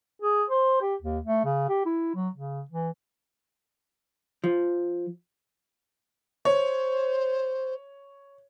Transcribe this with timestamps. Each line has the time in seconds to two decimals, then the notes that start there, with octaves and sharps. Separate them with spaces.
0.22 G#4
0.50 C5
0.82 G4
1.02 D#2
1.25 A3
1.45 C#3
1.69 G4
1.86 E4
2.15 F#3
2.35 C#3
2.71 E3
4.44 F3
6.45 C5 C#5